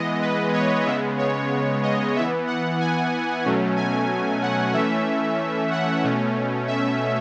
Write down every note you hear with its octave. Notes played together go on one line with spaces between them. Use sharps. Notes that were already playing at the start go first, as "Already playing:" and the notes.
Already playing: E3 G#3 B3 D#5
B4
C#5
C#3 G#3 B3 E5
C#5
D#5
E3 B3 E5
F#5
G#5
B2 F#3 A3 C#4
G#5
F#5
E3 A3 C#4 E5
F#5
B2 A3 C#4
E5